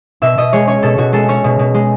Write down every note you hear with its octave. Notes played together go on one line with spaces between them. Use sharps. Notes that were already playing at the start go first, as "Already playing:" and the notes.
B2 E5
B2 D#5
G#3 C#5
C#4 C#5
B2 A4
B2 F#4
G#3 A4
C#4 C#5
B2
B2
G#3